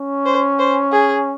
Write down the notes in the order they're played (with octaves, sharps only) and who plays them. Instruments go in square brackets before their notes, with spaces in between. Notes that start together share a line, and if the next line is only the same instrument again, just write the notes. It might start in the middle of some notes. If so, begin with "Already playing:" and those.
Already playing: [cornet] C#4
[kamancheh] C5
C5
G#4